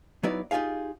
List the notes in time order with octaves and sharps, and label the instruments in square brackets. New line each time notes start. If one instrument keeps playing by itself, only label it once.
[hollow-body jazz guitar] F#3 B3 D#4 E4 B4 D5
D#4 F4 G4 G#4 F5